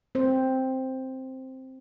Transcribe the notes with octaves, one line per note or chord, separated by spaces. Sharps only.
C4 C5